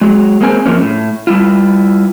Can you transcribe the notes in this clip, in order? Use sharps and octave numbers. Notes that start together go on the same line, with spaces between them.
F#3 G#3
G#3 A#3 C4 G#5
F#2 F3 A#3 C#4
A2
G3 E4 F4